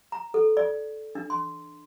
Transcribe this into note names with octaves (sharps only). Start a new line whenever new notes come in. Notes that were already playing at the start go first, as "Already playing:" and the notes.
A#5
A4
D5
D4
C6